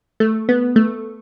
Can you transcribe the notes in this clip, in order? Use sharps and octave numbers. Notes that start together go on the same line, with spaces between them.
A3
B3
A3